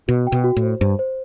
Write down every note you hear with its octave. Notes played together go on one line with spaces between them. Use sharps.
B2 F#4
G5
B2
F#4
A2
C5
G2 C5
C5